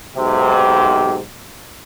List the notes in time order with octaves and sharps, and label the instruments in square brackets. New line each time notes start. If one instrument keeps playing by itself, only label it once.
[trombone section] B1 G#2 C3